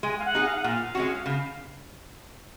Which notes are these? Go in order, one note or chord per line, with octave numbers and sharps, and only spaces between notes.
G#3 G#5
F5
F#5
D#4 G#4
F5
F#5
A#2 F5
G#3 C#4 F#4
C#3 F5